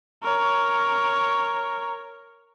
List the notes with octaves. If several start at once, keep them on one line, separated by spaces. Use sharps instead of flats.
A#4 C#5